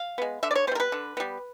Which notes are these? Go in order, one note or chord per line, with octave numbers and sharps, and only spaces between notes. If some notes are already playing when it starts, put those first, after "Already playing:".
Already playing: F5
G#3 B3
D3 E5
D5
C#5
G3 B3 A#4 C5
B4
D3
G3 B3